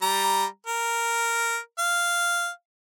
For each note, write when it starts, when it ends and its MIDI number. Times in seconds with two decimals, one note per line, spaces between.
0.02 0.45 55
0.02 0.45 82
0.67 1.58 70
1.79 2.49 77